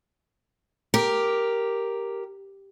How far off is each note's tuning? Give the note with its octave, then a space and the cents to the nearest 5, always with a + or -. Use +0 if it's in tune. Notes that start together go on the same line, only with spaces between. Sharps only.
G4 +0 A#4 +0